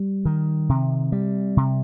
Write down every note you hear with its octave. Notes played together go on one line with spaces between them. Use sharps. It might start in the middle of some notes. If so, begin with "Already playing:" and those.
Already playing: G3
D#3
C3
G3
C3